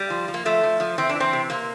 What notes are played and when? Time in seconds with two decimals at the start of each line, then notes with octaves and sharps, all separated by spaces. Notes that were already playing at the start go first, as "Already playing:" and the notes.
Already playing: G3
0.10 F3
0.28 F3
0.34 A#3
0.45 F3 A3
0.63 F3
0.80 F3
0.98 E3 C4
1.09 D4
1.15 E3
1.20 C4
1.33 C3
1.50 C3 A#3